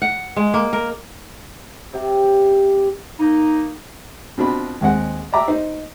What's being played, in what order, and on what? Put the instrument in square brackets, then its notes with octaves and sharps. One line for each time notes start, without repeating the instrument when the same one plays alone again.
[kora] F#5
G#3
A#3
A#4
[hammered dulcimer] C3 G4
[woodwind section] A#3 D#4
[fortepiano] B2 C4 D4 F4 B5
D#2 G#3 C4 F#5
D5 E5 A#5 D6
D#4 C5